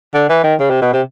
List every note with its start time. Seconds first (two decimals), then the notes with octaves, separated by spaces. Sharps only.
0.14 D3
0.29 E3
0.44 D#3
0.60 C#3
0.70 C3
0.82 B2
0.93 C3